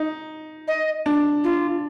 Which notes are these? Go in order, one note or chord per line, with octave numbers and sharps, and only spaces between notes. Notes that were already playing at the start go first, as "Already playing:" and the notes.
Already playing: D#4
D#5
D4
F4